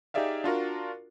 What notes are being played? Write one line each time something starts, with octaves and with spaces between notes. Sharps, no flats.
D#4 G4 G#4 D5 E5 F5
D4 F4 F#4 A#4